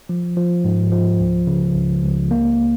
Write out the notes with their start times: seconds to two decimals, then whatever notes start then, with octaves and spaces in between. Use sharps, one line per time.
0.09 F3
0.37 F3
0.64 G#2
0.92 F3
1.19 C#2
1.47 C#3
1.75 C#2
2.03 C#2
2.31 A#3